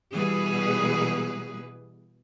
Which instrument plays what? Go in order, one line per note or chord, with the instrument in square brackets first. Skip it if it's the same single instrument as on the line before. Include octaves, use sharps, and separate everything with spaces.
[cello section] B2 E3 G3 G#4 B4